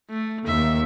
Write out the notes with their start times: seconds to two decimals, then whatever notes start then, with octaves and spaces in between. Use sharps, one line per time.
0.10 A3
0.47 D#2 E5